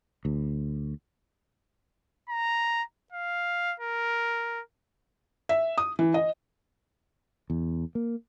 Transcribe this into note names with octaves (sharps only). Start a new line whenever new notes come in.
D2
A#5
F5
A#4
E5
D#6
E3
D#5
E2
A#3